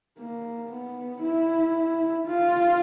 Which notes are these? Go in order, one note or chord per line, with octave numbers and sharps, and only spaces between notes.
A#3
B3
E4
F4